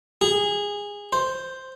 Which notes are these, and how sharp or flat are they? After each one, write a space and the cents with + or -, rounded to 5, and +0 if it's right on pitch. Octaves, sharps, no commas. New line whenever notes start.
G#4 -20
C5 +0